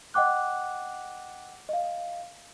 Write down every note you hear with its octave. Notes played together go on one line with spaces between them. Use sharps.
D#5 F#5 G5 D6 F#6
D#5 F5